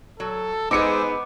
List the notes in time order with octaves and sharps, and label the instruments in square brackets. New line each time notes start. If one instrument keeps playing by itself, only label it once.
[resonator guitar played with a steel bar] F#3 [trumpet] A4
[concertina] G#3 C5 E6 [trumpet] B3 [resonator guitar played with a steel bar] D#4 G#4 [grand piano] D6 C#7